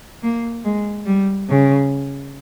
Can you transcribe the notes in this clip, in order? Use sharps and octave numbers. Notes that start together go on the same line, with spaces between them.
A#3
G#3
G3
C#3